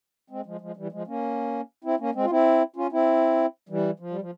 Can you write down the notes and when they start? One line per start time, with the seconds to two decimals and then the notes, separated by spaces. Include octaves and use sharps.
0.30 G#3 C4
0.46 F3 G#3
0.61 F3 G#3
0.77 E3 G3
0.92 F3 G#3
1.07 A#3 C#4
1.84 C4 E4
2.00 A#3 C#4
2.15 G#3 C4
2.24 F4
2.30 C4 E4
2.76 C#4 F4
2.92 C4 E4
3.69 E3 G3
4.00 F3
4.10 G3
4.21 F3